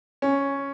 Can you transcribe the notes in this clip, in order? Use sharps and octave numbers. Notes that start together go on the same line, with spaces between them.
C#4